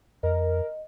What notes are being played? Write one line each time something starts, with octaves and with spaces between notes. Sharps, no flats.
F2 A#4 D#5